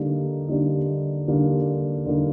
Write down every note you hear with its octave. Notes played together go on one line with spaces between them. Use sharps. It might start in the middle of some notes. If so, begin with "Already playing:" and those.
Already playing: D3 G3 A#3 D#4
D3 G3 A#3 D#4
D3 G3 A#3 D#4
D3 G3 A#3 D#4